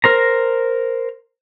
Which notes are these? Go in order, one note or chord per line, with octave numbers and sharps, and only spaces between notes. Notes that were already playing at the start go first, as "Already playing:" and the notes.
A#4 C5 A#5